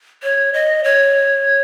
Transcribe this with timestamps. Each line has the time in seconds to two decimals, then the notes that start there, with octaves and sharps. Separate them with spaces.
0.23 C#5
0.54 D#5
0.84 C#5